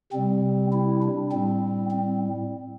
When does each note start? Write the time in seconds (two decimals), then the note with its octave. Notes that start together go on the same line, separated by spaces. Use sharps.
0.12 C3 G3 C4
0.72 E4
1.02 D4
1.32 A2 G3 C4
1.91 C4